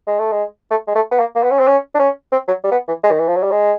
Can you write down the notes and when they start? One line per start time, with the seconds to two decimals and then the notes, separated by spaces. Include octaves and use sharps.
0.07 G#3
0.19 A3
0.31 G#3
0.70 A3
0.87 G#3
0.95 A3
1.11 B3
1.19 A#3
1.35 A#3
1.43 B3
1.51 C#4
1.59 C4
1.67 C#4
1.95 D4
1.99 C#4
2.32 C4
2.47 F#3
2.63 G3
2.71 B3
2.87 E3
3.03 G#3
3.11 D#3
3.20 E3
3.28 F3
3.36 F#3
3.43 G3
3.51 G#3